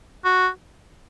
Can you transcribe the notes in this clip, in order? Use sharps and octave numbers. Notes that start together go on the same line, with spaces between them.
F#4